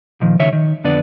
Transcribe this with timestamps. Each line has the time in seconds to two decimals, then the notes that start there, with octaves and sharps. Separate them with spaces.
0.21 A#2 D#3 F3
0.39 C#2 D#3 C#5 E5
0.53 D#3
0.84 F2 D3 B3 D5